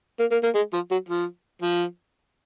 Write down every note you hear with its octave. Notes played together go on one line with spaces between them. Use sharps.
A#3
A#3
A#3
G#3
F3
F#3
F3
F3